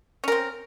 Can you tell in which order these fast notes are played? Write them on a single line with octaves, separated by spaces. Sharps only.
C#4 A#4 C4